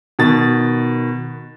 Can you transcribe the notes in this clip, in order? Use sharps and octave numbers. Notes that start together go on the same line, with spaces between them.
B2 D#3 A6